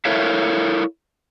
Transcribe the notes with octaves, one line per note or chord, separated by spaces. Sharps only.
E4 A4 A#4 C#5 E5 F5